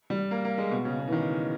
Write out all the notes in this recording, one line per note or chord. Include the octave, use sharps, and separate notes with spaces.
G3
A#3
A#3
G#3
B2
C#3
B2
E3
D#3